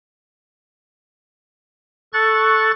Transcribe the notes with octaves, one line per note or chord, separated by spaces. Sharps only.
A4 C#6 F#6 A6